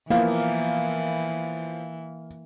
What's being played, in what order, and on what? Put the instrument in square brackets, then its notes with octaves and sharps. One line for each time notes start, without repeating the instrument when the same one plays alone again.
[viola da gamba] E3 [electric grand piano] F3 B3 E4 [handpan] A#3 [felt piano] F5